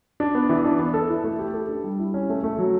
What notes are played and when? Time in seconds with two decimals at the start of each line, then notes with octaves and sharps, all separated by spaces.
0.20 D4
0.35 B3
0.49 E3
0.65 D4
0.79 B3
0.94 A4
1.10 E4
1.24 A3
1.39 G4
1.54 A4
1.69 D4
1.84 G3
1.99 E4
2.14 C#4
2.29 A3
2.43 A3
2.58 F#3